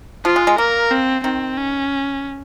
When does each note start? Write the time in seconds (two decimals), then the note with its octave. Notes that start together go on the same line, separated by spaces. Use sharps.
0.25 F3 F4
0.36 G#3
0.47 G#3
0.58 A#3 A#4
0.91 C4
1.24 D#3 C4
1.57 C#4